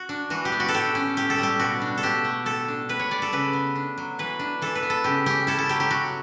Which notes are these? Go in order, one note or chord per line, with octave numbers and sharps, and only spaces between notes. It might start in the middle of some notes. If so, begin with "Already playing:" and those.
Already playing: F#4
D4
E3 F#4
G4
B3
F#4
A4
A2 G4
C#4
A2 G4
A4
G3 G4
B2 F#4
D4
A4
B2 G4
A3
A2 A4
D4
A2 B4
C#5
G3 D5
A4
C#3 B4
B3
D4
F#3
E3 B4
D4
E3 A4
B4
B3
A4
C#3 G4
C#4 G4
E4 A4
A4
F#3 G4
G4
F#3 F#4